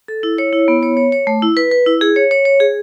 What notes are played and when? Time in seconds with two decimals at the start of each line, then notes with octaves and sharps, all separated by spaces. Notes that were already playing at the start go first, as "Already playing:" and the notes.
0.08 A4
0.23 E4
0.38 C#5
0.53 E4
0.68 B3
0.83 C#5
0.97 C#5
1.12 C#5
1.27 A3
1.42 E4
1.57 B4
1.71 B4
1.86 E4
2.01 G#4
2.16 C#5
2.31 C#5
2.45 C#5
2.60 G#4